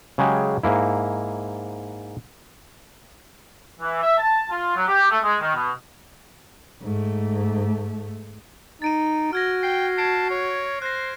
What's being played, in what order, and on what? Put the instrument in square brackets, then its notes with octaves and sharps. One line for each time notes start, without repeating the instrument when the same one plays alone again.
[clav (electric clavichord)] C#3 F#3 G#3 G4
G#2 A#3 E4
[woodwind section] E3
E5
A5
F4
F#3
G4
A3
G#3
D#3
B2
[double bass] G#2 A3
[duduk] D#4 [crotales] A6 D7 D#7
[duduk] F#4 [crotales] F6 G#6 A#6
[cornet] G5 [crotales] C7
[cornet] A5 [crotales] G#6 C7 D7
[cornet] C#5
[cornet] C5 [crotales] F#6 A#6